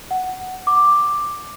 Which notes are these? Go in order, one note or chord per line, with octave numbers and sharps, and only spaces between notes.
F#5
D6